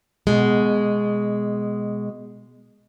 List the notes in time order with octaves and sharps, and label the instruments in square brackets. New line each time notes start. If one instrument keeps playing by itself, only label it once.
[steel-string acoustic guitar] B2 G#3